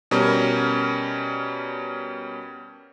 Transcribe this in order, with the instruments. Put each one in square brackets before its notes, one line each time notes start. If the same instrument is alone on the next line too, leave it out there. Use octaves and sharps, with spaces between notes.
[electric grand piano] B2 G3 C#4 A#4